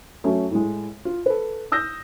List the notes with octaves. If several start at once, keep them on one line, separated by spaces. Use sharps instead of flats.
F#3 A3 C#4
A2 G#3
F4
A4 B4
D#6 E6 G6 A#6